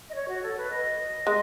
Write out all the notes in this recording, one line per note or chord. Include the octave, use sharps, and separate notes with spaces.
D#5
C#5
F#4
A4
B4
D#5
G#3 D#5